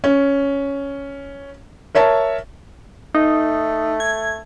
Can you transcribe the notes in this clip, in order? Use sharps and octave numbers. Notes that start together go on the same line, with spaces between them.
C#4
A#4 C#5 E5 A5
A3 D#4
G#6